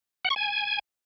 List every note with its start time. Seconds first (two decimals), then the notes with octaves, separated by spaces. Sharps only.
0.25 F#5
0.30 C#6
0.36 G#5